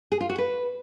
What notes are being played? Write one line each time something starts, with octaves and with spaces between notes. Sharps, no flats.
G#4
F4
F#4
B4